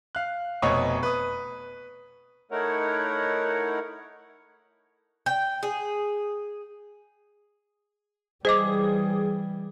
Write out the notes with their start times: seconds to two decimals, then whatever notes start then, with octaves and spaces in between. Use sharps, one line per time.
0.15 F5 F#6
0.62 F1 B2 C#5 D#5 C#6 D#6
1.03 B4 D#6
2.51 A3 D#4 E4 A#4 C#5 F#5
5.26 G5
5.63 G#4
8.45 E3 G3 G#4 C5 D#5 D6